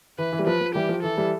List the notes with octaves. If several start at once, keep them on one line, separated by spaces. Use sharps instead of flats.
E3 B4
E3
G3
F3 B4
F3
E3 G3 G4
F3
E3 A4
E3 G3